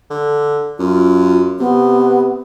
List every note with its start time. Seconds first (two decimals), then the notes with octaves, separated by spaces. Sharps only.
0.10 D3
0.79 F#2 F4
1.59 C3 B3